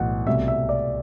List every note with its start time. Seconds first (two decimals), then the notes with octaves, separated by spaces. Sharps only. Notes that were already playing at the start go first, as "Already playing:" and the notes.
Already playing: B1 A2 E3 F#5
0.27 C2 B2 A3 E5
0.48 E5
0.69 D5